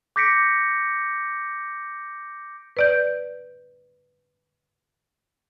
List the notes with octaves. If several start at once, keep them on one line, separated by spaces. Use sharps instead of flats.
D6 G6 A#6 B6 C#7 D7
B4 D5 G6